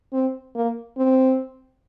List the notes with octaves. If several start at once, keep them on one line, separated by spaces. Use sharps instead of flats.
C4
A#3
C4